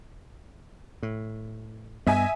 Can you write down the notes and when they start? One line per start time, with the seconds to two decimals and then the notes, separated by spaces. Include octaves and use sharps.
1.03 A2
2.07 G2 G3 B3 D#5 E5 G#5